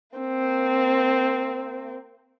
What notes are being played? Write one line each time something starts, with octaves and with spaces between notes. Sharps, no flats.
A#3 C4